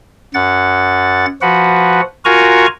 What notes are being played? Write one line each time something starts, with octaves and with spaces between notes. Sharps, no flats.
F#2 F#5 A6
F3 F#4 B4 F#5
F4 F#4 A#4 G#5 A#5 C#6